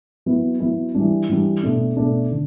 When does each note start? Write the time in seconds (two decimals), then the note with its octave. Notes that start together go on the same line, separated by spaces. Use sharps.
0.26 F#3 B3 E4
0.60 F#3 B3 E4
0.95 E3 G3 D4
1.29 E3 G3 D4
1.63 B2 A3 D4
1.97 B2 A3 D4
2.31 D3